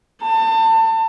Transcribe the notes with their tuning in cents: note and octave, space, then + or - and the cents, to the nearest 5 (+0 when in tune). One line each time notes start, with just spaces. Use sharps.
A5 +30